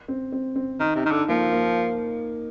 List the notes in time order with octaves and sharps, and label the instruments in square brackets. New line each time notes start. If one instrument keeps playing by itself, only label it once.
[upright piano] C4
C4
C4
[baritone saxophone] D#3 [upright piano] D#4
[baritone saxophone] C3
[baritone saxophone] D#3 [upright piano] D#4
[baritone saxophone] D3
[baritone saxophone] F3 [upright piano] A#3
[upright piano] A#3